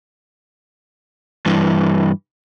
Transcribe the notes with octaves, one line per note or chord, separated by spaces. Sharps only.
G2 E3